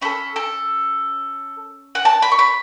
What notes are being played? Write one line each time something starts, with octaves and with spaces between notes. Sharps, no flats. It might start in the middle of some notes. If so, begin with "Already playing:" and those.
C#4 A4 B5
A4
F#5
A5
B5
C#6
B5